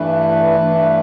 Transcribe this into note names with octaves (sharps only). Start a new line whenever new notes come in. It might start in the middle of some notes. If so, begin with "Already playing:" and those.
Already playing: G2 E3 A3 D4 B4
G2 E3 A3 D4